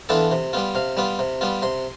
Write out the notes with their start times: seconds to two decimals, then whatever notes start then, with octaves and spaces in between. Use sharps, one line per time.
0.09 E3 B3 D4 F4 A4
0.32 C3
0.53 G3 B3 F4
0.75 C3 F5
0.97 G3 B3 F4
1.19 C3
1.41 G3 B3 F4
1.62 C3 C6